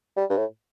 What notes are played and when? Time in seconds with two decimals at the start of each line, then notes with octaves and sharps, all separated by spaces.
0.17 G3
0.30 G2
0.37 A2